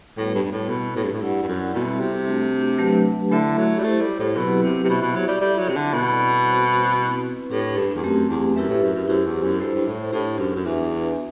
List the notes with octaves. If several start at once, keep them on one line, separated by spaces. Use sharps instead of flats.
A2 G3 B3 F#4 B4
G2
G2
A2
B2 C4 E4 B4
A2
G2
A2
G2 E4 G4 D5 F#5
G2
F#2
B2 G3 C4 E4 A4 E5
C3
A3 D4 F#4
F#3 A3 D4 G4 B4
D3 A3 E4 A4 E5
F#3
G3
A3 E4 G4 C5
G3
A2
B2 F#3 C4 E4 G4 B4
C3
C3
B2 E4 G4 C5 E5
B2
F#3
G3
G3 E4 A4 E5
F#3
C3
D3
B2 G3 C4 E4 A4 D5
G3 C4 F#4 C5
C4 E4 B4
A2 D4 G4 B4
G2
E2
F#2 A3 C4 G4
E2
F#2 E4 G4 B4 E5
A2
F#2
F#2
F#2 E4 G4 C5
E2
F#2
G2 E4 A4 C5
G2
A2
A2 D4 G4 C5
F#2
F#2
E2 D4 F#4 B4 E5